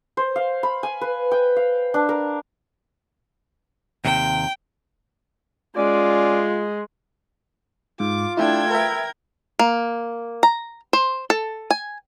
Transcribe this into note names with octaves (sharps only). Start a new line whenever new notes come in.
C5
F5
B5
G#5
B4
G5
F5
D4
A#4
D#2 C3 G5
G#3 C#4 F4 D5
G#2 F4 D6
A3 D4 E4 G5 G#6
A#4 B4 E5
A#3
A#5
C5
A4
G#5